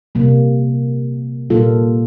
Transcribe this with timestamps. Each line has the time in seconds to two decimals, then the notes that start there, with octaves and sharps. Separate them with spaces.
0.15 C3 G3 A#3
1.50 A#2 G3 A#3 F4 A4